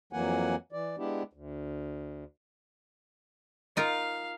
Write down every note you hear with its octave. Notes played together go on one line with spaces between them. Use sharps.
F2 E3 F#3 A#3 F#5 G#5
E3 D5
G#3 B3 D4 E4 G4
D2
D#4 F4 A#4 F5